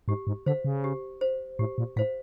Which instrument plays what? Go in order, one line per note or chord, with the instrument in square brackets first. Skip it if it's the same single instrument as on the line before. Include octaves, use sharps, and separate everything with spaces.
[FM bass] G#2 [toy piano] G4
[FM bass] G#2
[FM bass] D3 [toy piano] C5 F5
[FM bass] C#3
[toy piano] G4
C5 F5
[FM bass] A2 [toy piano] G4
[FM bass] A#2
[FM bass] A2 [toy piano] C5 F5